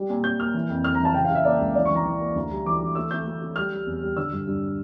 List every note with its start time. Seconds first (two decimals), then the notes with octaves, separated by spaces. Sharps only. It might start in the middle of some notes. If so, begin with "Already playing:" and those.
Already playing: G3
0.10 A#2
0.24 A#2 G6
0.39 A#3 F6
0.54 E3
0.69 F2
0.84 F2 F6
0.95 A#5
1.00 E3 A5
1.14 C#3 G5
1.25 F5
1.30 C#3
1.35 E5
1.45 A#3 D5
1.60 C#2
1.75 E3 D5
1.85 C#6
1.90 E3
1.95 A#5
2.05 E3
2.20 A#3
2.35 D2
2.50 G3
2.66 E3 D6
2.81 E3
2.95 A3 E6
3.11 A3 G6
3.26 A3
3.41 A3
3.56 G3 F6
3.71 G3
3.86 E2
4.02 G3
4.16 D3 E6
4.32 G2
4.47 G2